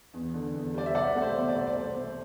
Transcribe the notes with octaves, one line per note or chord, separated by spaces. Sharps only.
E2
D3
E2
G3 D5
E5
C2 D5 F#5
A3 F#5
C5 E5
B2
C5
D5
C2
D5
A3 C5
A3